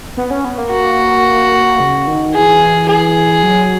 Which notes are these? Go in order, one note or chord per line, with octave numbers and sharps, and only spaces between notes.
B3
C#4
B3
A#3
F#4
C#3
D#3
E3 G#4
G#4
F#3